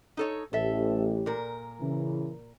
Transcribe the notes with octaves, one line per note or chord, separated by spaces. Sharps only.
D#4 A4 C#5
A1 A2 G4 A4 E5
A#2 A#4
C#3 E3